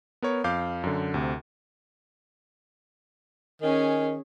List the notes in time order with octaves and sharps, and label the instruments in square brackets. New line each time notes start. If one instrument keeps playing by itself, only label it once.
[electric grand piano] B3 A#4 C#5
F2 F5 D6 G6
F#2 D3
D2 C3
[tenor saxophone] D#3 [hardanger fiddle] C#4 G#4